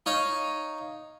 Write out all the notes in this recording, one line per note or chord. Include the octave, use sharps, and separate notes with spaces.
D#4 C#5 F5